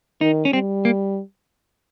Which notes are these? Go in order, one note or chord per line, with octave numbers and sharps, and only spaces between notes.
D#3 D#4
C#4
G3 C4
A#3